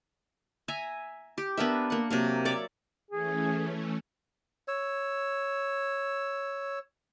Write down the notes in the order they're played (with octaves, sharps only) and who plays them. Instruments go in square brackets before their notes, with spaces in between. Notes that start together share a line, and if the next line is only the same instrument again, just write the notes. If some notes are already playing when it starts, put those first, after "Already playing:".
[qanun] E5 G#5 A#5
G4
B3 D4 A#4 E5
A#3 F#5
C3 F#3 A#3
C#5 D5 E5 D6
[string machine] E3 A3 C#4 [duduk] G#4
[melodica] C#5 E6